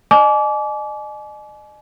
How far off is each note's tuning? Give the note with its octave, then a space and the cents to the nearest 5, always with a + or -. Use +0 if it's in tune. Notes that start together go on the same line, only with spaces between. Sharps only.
D#5 -40 G#5 +40 D6 -25